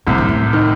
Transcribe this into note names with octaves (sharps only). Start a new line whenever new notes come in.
C2 A2 C3
G2
A2
D#3